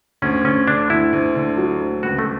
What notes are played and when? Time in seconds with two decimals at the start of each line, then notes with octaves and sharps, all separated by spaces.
0.22 D2 C#4
0.44 D2 C#4
0.67 D3 D4
0.90 D2 E4
1.13 D2
1.35 D3
1.57 F#3
1.81 D2
2.03 C#2 F#4
2.19 A3